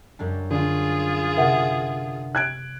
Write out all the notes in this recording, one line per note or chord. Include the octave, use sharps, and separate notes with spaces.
F#2 G3 D4
D3 F4 G#4
C3 A#4 E5 F#5
F#6 G#6 D7